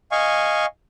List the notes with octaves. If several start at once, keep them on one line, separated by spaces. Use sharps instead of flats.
D#5 F5 G#5 C#6